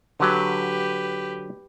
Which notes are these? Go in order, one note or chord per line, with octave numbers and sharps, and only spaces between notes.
D3 F#3 G4 B4